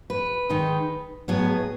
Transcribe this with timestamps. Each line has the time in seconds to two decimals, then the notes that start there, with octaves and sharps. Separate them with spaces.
0.10 B4
0.49 D#3 G#3 D#4
1.28 A2 F#3 B3 G#4